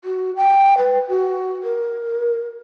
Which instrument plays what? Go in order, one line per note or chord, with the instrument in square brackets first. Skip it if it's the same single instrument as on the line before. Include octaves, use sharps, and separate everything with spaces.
[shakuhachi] F#4
G5
B4
F#4
A#4